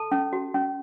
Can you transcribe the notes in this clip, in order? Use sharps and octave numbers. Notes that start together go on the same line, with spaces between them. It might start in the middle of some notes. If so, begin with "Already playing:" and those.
Already playing: A4 A5
C#4
F#4
C#4